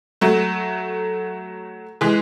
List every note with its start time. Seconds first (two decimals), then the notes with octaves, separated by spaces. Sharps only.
0.21 F#3 A3
2.01 E3 G#3